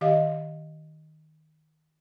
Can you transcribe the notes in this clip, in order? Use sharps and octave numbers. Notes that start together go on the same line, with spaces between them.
D#3 G4 D#5 F5